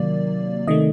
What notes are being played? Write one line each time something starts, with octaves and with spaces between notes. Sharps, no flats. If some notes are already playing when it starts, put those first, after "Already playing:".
Already playing: C3 D#3 F#3 A#3 D5
C3 D#3 A3 D#5